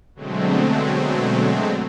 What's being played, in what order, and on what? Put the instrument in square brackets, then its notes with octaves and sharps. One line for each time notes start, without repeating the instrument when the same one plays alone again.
[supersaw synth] B2 D3 F#3 G#3 A3 C4